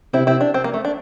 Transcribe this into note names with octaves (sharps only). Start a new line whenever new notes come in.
C3 C4 E4
C4 E4
D4
C4
A#3
A3
D4